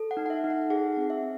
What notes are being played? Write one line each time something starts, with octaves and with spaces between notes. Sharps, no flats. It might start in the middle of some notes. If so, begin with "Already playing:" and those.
Already playing: A4
F#5
D#4
F#5
E5
D#4
F#5
G#4 F#5
C4
E5